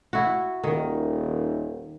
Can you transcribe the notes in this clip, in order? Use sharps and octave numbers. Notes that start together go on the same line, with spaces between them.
E4 F#4
D#1 D#3